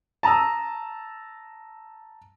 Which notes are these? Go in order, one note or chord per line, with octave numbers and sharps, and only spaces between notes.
A5 A#5 D#6 E6